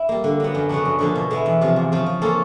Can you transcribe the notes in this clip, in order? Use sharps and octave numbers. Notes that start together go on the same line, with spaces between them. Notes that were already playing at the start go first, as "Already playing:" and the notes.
Already playing: E4
G3 A#3
D3
F#3 B3
F#2
C#3 F#3 B3 D4
F#2
D3 F3 A#3 C#4
B2
G#3 B3 E4
E2
C3 F3
E2
C#3 F3
F3
A#3 C#4 F4 A4